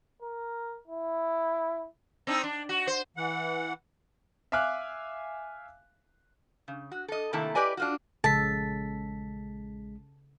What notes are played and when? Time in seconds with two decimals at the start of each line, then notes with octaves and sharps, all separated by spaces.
0.22 A#4
0.87 E4
2.27 C4 D4 D#4
2.44 D4
2.69 F#4
2.87 C5
3.17 E3 F#5
4.52 E5 F5 G#5 D6 F6 F#6
6.68 C#3
6.92 F#4
7.08 A4 D#5
7.33 C3 D#3 A3 A#3 E4 A5
7.55 G4 B4 D5 D#5 G#5
7.77 D4 F4 F#4
8.24 A#1 C#3 G#3 A4 A5 B6